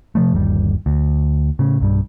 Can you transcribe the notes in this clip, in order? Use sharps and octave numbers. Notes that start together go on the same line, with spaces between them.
C3 F3 A3
G1 D#2 G3
D2
A2 C#3
B1 G2 G3